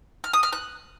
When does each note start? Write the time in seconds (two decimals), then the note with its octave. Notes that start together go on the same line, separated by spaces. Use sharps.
0.24 F6
0.33 D#6
0.43 F6
0.53 F#6